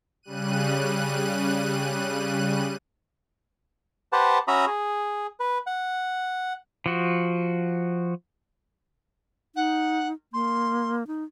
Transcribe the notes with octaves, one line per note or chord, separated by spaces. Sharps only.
C#3 G3 F#6 D#7
G4 B4 C5 F#5 A5
C#4 F#4 E5 A#5 B5 D#6
G#4
B4
F#5
F3 F#4
D#4 F#5
A#3 C6
D#4